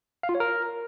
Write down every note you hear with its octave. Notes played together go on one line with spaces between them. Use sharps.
F5
F4
C#5
A#4